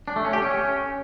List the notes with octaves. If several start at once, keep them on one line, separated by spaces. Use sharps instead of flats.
D4
A3
C#4
G4
C#4